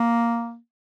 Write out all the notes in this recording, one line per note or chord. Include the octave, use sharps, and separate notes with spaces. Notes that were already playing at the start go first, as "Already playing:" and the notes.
Already playing: A#3